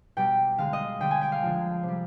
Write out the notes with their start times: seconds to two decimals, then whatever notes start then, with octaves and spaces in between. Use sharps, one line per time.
0.17 B2 G3 G5
0.58 D3 G#3 F5
0.73 D#5
1.00 D3 G3 G5
1.11 G#5
1.21 G5
1.32 F5
1.42 D3 F3 G#3
1.83 C3
1.88 G3